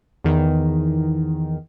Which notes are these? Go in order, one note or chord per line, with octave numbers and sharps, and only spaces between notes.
E2 D#3